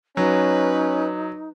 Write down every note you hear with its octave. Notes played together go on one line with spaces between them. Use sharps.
F#3 C#4 D#4 B4